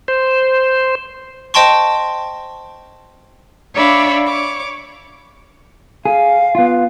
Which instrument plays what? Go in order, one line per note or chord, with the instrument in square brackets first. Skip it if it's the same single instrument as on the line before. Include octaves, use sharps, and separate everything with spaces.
[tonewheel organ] C5
[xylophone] C5 D#5 G5 A5 C6 C#6
[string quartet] D4 C#5 D5 E5 F5 B5
C#5 D6
[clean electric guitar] G#4 [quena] F5
[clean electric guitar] B3 F4